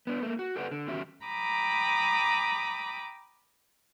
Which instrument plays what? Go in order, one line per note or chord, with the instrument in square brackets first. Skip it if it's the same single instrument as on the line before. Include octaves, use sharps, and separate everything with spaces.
[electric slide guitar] B3 D4
A3 A#3
F#4
G4 A4 B4 D5 F5 F#5
D3
E2 D#3 C#4 F#4 G4 E5
[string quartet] G5 A#5 B5 D6 D#6